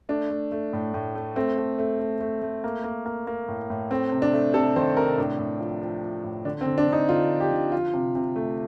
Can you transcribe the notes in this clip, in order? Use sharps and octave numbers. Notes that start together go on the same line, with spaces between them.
A3 D4
A3
A3
A2
A2
A3
A3 C4
A3
A3
A3
A3
A3
A#3
A#3
A#3
A#3
A2
A2
A3 C4
C3
D4
A3
C3 A4
D#3 C5
C3 A#4
A2 D4
A2
F3
F3
F3
A2
D3 D4
C4
D3
D4
D3
D#4
D3 F4
F3
G4
D3
F3 F4
C3
C3
A3